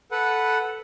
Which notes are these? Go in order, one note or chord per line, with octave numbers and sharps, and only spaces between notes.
A4 B4 F#5